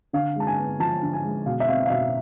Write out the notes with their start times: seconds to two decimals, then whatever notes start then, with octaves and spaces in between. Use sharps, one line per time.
0.13 D3 F5
0.36 G#3 A5
0.47 G#5
0.58 B3
0.80 F3 A5
1.02 D3
1.13 G#5
1.24 G#3
1.46 B2 F5
1.60 E5
1.68 C4 F5
1.86 F5
1.90 B2 E5